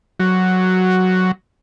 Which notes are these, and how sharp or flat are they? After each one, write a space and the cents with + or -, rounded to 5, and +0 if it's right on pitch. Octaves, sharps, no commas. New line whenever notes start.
F#3 +0 F#4 +5